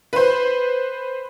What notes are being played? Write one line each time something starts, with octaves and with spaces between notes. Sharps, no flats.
B4 C5